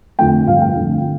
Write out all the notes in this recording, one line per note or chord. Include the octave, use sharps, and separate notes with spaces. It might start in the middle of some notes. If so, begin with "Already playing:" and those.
F2 D3 F3 A3 G5
G2 F3 A3 F5
G5
F2 D3 A3